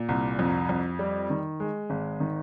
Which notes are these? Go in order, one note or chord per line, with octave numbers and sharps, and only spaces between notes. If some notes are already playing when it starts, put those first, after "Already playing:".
Already playing: A#2
C2
F2
F2
G3
D#3
G#3
G#1
D#3